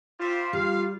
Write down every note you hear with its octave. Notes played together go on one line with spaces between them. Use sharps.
G3 F4 C5 E5
G3 F5